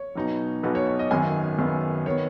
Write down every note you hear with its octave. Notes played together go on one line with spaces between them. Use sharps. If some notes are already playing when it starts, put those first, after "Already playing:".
Already playing: C#5
B1 B2 B3 D#4
B1 B2 B3 D#4 B4
C#5
C#5
D#5
G#1 F#2 D#3 B3 G#5
G#1 F#2 D#3 B3
D#3 B3 C#5